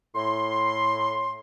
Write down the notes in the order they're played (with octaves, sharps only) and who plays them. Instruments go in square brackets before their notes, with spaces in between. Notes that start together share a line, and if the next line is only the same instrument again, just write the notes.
[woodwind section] A2 C6